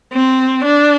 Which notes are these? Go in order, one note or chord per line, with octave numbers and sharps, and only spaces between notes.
C4
D4